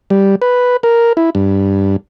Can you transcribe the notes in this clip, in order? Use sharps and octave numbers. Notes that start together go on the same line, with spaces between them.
G3
B4
A#4
E4
G2